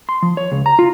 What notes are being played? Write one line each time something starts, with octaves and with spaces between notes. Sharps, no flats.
C6
F3
C#5
C#2
A#5
F4